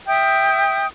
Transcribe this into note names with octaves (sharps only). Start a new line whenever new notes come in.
E5 G5 D#6 G6